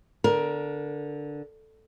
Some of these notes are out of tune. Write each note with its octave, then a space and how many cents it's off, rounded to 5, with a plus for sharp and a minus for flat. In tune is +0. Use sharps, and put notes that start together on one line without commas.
D3 -5 A#4 +15